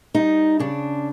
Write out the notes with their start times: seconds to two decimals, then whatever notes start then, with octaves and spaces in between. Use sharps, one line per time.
0.14 G3 D#4
0.60 C#3 D4